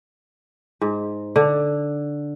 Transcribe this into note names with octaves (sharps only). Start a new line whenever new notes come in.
G#2
D3